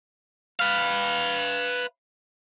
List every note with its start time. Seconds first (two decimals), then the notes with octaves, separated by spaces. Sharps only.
0.60 B4 F5